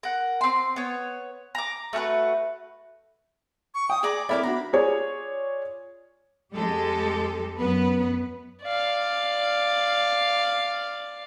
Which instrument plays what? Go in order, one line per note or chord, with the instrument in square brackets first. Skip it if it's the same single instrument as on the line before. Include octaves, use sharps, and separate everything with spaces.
[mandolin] A#4 F#5
C4 C6
B3 C#5
A#5 D6
A3 F#4 A#4 B4
[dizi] C#6
[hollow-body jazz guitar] G5 [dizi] D#6
[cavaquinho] G#4 D5 A#5 [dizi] D6
[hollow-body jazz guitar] C4 A4 D5 [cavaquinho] E4 A#4 D6 [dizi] B5
[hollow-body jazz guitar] B3 D4 F#4 [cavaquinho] A#5
[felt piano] F4 G#4 C#5 D5
[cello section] F2 G#3 G4 A4
F#2 B3 B4
[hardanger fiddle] D5 F5